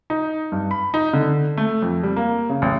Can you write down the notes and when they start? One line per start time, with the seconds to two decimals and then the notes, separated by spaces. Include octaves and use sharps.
0.10 D#4
0.52 G2
0.71 B5
0.94 D#4
1.13 D3
1.57 A3
1.82 F2
2.03 G3
2.16 A#3
2.49 C#3
2.62 A1